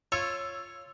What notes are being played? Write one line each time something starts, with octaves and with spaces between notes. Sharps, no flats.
F4 C#5 E6